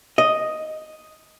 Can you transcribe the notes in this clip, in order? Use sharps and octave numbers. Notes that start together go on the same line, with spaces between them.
D#5